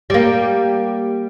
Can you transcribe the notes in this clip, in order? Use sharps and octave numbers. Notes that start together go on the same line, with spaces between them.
G3 A#3